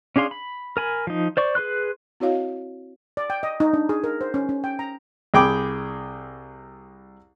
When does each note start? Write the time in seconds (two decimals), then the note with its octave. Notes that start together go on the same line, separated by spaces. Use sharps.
0.16 C#4 D4 G#4 F5 C6
0.31 B5
0.77 A#4 G#5 B5
1.07 F3 D#4
1.37 C5 D5 C#6
1.55 G#4 B4 C6 F#6
2.20 C4 E4 F#4 C#5 D#5 F5
3.17 D5
3.30 G5
3.43 D#5
3.60 D#4
3.73 D4
3.89 G#4
4.04 A#4
4.21 C5
4.34 C#4
4.49 C#4
4.64 G5
4.79 A#5
5.34 C2 G#4 G5 B5 D6